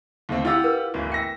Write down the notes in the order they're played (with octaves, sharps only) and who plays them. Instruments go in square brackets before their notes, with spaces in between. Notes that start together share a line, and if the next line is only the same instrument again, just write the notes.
[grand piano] D#2 A3 C4
[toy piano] E4 E6 [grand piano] F4 G4 F#5
[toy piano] A#4 B4
[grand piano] D1 G1 E3
[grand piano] E5 A#6 [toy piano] G5